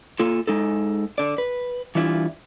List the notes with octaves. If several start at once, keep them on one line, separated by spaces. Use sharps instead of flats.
A#3 F4 A4
G#3 D#4 A4
D3 D5
B4
E3 G3 D4 E4 F4